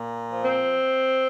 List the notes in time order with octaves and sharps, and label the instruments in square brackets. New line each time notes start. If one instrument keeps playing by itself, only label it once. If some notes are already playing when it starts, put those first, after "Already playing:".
Already playing: [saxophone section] A#2
F3
C4